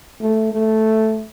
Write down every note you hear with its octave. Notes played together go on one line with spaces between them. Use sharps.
A3
A3